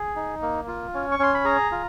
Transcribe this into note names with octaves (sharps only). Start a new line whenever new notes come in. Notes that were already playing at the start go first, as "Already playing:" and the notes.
Already playing: G#4
D#4
A#3
F4
C#4
C#6
C#4 C6
B5
G#4 A#5
F4